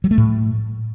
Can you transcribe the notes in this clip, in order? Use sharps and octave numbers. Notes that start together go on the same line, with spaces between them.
F#3
A3
A2